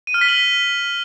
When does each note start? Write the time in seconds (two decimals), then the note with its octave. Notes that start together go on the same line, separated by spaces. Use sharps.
0.07 D#7
0.14 F6
0.21 B6
0.28 F#7